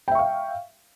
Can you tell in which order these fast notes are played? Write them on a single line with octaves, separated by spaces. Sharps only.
G5 E5 C#6 F5